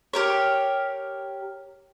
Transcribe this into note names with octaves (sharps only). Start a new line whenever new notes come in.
G4 A#4 C#5